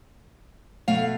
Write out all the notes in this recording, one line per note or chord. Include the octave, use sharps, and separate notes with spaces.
B2 A3 F5